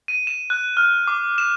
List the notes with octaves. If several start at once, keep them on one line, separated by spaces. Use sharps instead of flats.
D#7
E7
F#6
F6
D6
E7